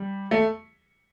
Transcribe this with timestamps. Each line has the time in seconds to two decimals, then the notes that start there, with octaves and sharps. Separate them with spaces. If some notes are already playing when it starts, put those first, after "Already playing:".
Already playing: G3
0.31 A3